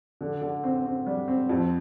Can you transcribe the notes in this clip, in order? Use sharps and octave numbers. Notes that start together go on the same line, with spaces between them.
D3
D3
C4
C4
G3
C4
F2